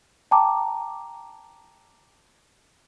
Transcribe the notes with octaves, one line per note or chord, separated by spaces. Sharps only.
G5 A5 A#5 D6